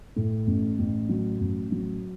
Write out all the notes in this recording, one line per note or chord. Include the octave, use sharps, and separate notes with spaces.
A2
A1
A1
F#3
A1
F#3